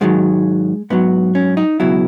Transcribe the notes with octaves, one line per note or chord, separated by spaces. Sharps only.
G#2 D#3 F#3 G#3
G#2 F#3 B3
C#4
D#4
C#2 B2 F#3 E4